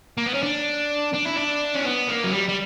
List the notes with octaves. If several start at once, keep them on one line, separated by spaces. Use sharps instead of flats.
A#3
B3
C#4
D4
D4
E4
D4
C#4
B3
A#3
F#3
G3
G3